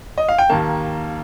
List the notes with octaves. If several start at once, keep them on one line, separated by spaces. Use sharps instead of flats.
D#5
F5
G5
D#2 D#3 A#3 A5